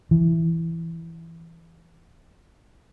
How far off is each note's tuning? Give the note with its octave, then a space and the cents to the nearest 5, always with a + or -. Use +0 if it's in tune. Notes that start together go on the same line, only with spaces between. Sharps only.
E3 +5